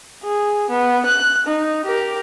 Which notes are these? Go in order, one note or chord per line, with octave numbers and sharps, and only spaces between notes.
G#4
B3
F#6
D#4
G4 A#4